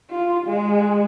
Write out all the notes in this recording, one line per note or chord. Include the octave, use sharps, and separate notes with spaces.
F4
G#3